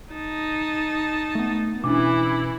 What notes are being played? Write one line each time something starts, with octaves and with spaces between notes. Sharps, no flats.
D#4 A5
A3 B3
B2 E3 C#4 D4 E4 D6